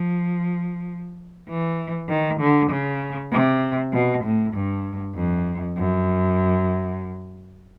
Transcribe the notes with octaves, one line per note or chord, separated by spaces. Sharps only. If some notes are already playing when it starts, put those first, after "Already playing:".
Already playing: F3
E3
D#3
D3
C#3
C3
B2
A2
G2
F2
F#2